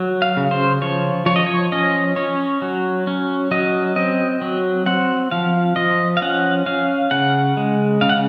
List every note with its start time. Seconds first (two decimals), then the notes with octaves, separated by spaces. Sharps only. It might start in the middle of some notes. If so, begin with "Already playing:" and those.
Already playing: F#3
0.22 F5
0.37 C#3
0.51 C5
0.82 F3 C#5
1.26 F3 C#5
1.36 D#5
1.46 C#5
1.72 C#4 D#5
2.16 C#4 C#5
2.62 F#3
3.07 C#4
3.51 F#3 D#5
3.96 C4 D#5
4.41 F#3
4.86 C4 F#5
5.31 F3 F5
5.76 F3 D#5
6.17 F5
6.22 C#4 F#5
6.66 C#4 F5
7.11 C#3 F#5
7.57 G#3
8.01 C#3 F5
8.09 F#5